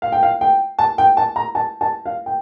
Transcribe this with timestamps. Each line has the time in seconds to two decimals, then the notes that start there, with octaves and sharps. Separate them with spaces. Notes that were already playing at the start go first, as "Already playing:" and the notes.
0.02 F5
0.12 G5
0.23 F5
0.41 G5
0.79 A5
0.98 G5
1.17 A5
1.36 A#5
1.55 A5
1.81 A5
2.06 F5
2.26 G5